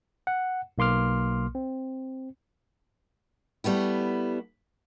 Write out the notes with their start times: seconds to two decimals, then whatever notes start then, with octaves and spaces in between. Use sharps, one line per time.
0.27 F#5
0.78 B1 A#3 C6 D6 F6
1.55 C4
3.64 G3 A3 B3 E4